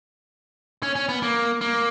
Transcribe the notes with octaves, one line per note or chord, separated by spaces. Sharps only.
C#4
C#4
B3
A#3
A#3